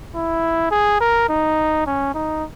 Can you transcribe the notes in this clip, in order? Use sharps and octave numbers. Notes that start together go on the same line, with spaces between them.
E4
G#4
A#4
D#4
C#4
D#4